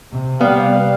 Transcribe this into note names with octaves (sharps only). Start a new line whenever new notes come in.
C3
G3 B3 F5